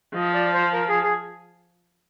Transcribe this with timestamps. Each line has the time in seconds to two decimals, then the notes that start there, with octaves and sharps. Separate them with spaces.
0.14 F3 D#5
0.34 D5
0.54 C5
0.73 A#4
0.89 G#4
1.03 G#4